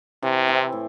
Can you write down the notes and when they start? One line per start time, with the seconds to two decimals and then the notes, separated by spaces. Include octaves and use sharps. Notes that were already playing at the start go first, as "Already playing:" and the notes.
0.23 C3 E3
0.48 C4 E4
0.72 A2